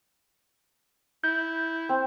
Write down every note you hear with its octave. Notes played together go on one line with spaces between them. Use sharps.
E4 G6
C4